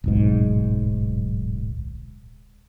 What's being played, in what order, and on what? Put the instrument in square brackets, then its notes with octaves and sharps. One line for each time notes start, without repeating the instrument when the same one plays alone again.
[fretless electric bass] D1 B1 G#2